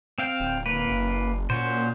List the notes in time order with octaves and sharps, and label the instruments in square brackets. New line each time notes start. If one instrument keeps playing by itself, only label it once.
[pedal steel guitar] C4 F5 G5
[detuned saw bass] D1
[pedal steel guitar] A#3 B4
[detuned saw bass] F#1
[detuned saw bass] A#2 [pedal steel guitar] C#4 F#4 C5